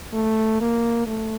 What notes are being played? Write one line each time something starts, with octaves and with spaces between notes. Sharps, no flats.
A3
A#3
A3